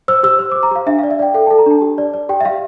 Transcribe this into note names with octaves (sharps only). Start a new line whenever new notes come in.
C5 E6
G4 E6
C5
G4 D6
A#5
G4 F5
D4 E5
D5 F5
E5
D5 G5
A4 G5
A4 A5
A#5
D4 A5
G4
D5
D5
G4 G5
E5
G4 F5